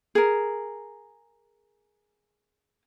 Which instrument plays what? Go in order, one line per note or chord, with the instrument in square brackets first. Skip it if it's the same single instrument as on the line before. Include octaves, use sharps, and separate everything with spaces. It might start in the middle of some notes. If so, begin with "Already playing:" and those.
[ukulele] G#4 A#4